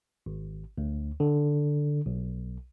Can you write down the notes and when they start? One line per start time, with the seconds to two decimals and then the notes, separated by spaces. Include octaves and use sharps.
0.26 G#1
0.78 D2
1.20 D3
2.06 B1